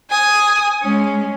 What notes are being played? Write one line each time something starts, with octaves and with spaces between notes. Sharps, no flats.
G#5 D#6
G#3 C#4